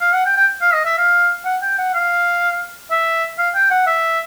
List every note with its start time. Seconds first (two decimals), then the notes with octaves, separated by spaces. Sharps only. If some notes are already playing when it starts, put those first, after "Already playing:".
0.01 F5
0.13 F#5
0.26 G5
0.37 G5
0.61 F5
0.73 D#5
0.85 E5
0.98 F5
1.45 F#5
1.62 G5
1.78 F#5
1.94 F5
2.91 E5
3.38 F5
3.55 G5
3.71 F#5
3.87 E5